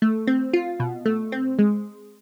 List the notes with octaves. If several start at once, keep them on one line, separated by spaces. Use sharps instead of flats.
A3
C4
F4
B2
A3
C4
G#3